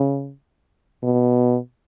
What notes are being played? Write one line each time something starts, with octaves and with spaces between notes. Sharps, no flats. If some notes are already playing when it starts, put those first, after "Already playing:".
Already playing: C#3
B2